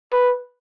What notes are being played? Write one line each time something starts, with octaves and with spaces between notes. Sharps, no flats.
B4